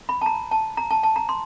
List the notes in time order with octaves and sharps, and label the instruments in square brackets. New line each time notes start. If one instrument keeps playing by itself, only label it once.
[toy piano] B5
A5
A#5
A5
A#5
A5
A5
A#5
C6